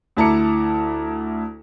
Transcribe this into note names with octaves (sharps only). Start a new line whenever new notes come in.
D2 E4 A5 A#5 D6 C#7